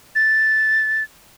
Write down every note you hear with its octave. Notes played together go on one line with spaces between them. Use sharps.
A6